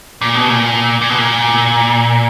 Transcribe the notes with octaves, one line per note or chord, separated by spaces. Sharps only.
A#2
B2
A#2
A#2
B2
A#2